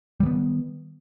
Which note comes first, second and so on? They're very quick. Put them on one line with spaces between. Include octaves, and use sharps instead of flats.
G3 D#3 B3